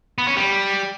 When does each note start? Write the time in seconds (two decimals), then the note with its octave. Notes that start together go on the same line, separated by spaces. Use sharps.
0.18 B3
0.27 C#4
0.37 G3